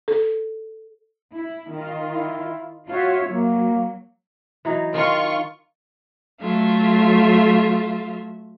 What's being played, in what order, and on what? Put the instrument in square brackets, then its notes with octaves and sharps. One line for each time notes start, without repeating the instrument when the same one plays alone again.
[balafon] A4
[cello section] E4
D#3 F4
[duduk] E4
[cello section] F4 C#5 E5 [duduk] F#4
[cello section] F#3 [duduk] A#3
[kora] E3 F#3 D#4
[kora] D#3 [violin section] F4 C#6
[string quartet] F#3 A3 F4 E5